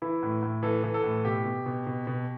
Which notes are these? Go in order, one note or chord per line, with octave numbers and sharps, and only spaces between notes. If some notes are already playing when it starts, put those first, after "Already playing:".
E3 E4
A2
A2
E3 A4
E3
A4
A2
B2 G4
B2
B2
B2
B2